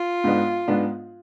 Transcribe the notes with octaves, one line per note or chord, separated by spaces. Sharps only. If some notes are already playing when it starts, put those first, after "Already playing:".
Already playing: F4
G#2 G#3 B3 D4
G#2 G#3 B3 D4